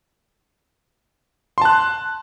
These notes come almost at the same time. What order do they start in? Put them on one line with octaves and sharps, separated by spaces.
C6 A5 F#6